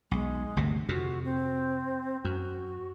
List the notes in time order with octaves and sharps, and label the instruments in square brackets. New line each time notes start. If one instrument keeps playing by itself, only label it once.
[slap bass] B1 [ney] G#3
[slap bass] G1 D2 C3
[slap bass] F2 C3 [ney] F#4
[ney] C4
[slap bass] F#2 [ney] F#4